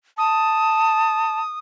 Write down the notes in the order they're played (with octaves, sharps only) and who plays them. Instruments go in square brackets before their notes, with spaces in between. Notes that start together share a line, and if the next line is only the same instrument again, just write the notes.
[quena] A5 [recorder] D#6